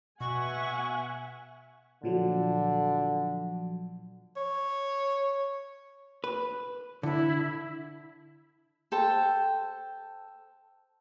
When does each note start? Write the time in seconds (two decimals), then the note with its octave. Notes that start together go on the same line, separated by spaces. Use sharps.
0.21 B2 E5 F#5 G#5 C#6
2.03 A#2 D3 F3 F#3
4.36 C#5
6.24 B4
7.03 D3 E4
8.92 A4 C5 G5